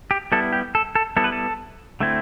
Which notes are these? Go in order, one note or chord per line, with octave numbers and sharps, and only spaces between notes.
G4
G3 B3 E4 A4
G4
A4
A4
G3 B3 E4 A4
B4
A4
D3 A3 C4 E4